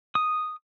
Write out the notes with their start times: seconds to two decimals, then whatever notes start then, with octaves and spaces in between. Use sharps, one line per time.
0.15 D#6